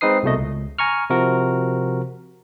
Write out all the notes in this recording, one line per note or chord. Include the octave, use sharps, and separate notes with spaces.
G#3 C4 D#4 B4 D#6 C7
C2 B2 A3 D#5
C#2
G#5 A#5 C#6 F6
C3 F3 F#4 A#4